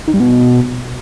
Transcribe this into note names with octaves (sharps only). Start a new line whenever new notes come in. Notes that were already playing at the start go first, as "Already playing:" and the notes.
D#3
G2
B2